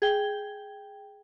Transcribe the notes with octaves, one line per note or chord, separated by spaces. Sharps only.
G#4 G5